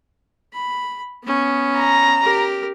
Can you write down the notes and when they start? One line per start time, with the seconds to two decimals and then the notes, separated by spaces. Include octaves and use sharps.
0.53 B5
1.24 B3 C#4
1.78 A#5
2.22 G4 A#4